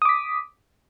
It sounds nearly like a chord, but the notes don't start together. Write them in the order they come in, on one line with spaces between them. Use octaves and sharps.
D#6 D6 B6